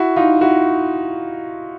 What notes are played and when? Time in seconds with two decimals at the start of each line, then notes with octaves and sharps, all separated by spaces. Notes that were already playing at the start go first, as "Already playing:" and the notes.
Already playing: E4 F#4
0.16 D#4 F4
0.41 E4 F#4